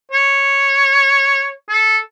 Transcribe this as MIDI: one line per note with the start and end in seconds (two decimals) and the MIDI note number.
0.11 1.52 73
1.69 1.98 69